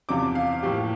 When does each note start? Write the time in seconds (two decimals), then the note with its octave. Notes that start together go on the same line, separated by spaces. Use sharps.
0.09 E2 C3 F3 D6
0.35 F5
0.63 A2 F3 A#3 G4